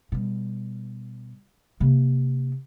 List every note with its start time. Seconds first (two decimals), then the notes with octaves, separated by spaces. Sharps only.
0.12 B2 G3
1.80 C3 A#3